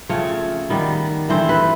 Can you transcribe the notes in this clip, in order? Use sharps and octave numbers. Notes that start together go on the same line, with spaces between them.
C#3 F3 A3 C4 C#5
D#3 G3 B3
G2 E3 A3 C4 C5
B4